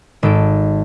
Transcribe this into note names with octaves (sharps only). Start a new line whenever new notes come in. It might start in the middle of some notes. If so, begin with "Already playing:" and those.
G#1 A4 D7